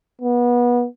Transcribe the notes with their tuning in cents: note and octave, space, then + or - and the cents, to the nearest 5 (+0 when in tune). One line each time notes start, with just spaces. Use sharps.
B3 -25